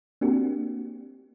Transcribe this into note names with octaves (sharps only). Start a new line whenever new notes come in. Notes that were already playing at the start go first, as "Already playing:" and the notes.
A#3 C4 D4 F#4 G4